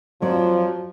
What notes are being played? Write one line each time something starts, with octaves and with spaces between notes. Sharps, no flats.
F2 F3 F#3 D5